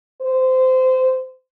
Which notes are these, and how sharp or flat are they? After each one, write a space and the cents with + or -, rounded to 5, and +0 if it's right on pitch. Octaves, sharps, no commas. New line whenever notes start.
C5 -20